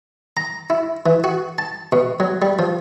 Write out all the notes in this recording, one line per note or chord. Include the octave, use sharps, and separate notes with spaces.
A#5
E4
E3
F#4
A5
B2
F#3
G3
F3